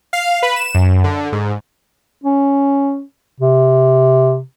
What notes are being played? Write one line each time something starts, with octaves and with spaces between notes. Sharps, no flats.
F5
B4
E7
F#2
D3
G#2
C#4
C3